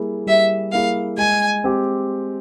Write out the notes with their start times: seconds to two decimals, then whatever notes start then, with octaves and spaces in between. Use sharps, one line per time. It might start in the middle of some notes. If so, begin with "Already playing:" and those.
Already playing: G3 A#3 E4 G#4
0.27 G3 E5
0.72 A#3 E4 G#4 F5
1.18 G#3 G#5
1.64 C4 G4